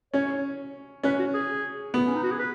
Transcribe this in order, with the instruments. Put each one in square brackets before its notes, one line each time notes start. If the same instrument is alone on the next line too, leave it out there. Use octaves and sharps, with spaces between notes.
[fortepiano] C#4 [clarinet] C#5
[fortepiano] C#4 [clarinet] B4
[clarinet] F#4
G#4
[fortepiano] B3
[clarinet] C#4
D#4
F#4
G#4
B4